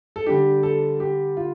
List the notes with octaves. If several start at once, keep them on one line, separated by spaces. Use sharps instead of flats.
A4
D3 G3 D4 G4
A4
G4
F4